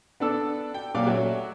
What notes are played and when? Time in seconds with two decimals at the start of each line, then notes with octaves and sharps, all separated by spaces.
0.20 B3 D4 A4 E6
0.74 G5
0.95 A#2 F#3 D5 F5 D6
1.06 F#3 A3 C#4 F#4 E5